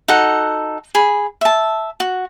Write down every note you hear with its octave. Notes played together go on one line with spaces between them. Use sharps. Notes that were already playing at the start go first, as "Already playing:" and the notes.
D#4 F#4 A4 F#5
G#4 B5
E5 A5
F#4